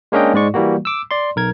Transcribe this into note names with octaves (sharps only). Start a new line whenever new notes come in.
G#3 A#3 C#4 D4 D#5 G5
G#2 G#3 D5 C#6
E3 G3 A#3 F#4
D6 E6
D5 C6
B1 A#4 G#6